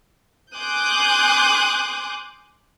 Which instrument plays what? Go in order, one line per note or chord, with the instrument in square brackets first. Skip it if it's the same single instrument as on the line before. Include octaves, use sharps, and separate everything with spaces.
[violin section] G#5 C6 D6 D#6 F#6 G6